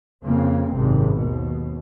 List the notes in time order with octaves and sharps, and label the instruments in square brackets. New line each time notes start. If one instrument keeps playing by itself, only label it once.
[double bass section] F2 C#3 A#3 C4
G#1 F#2 C3
D#2 B2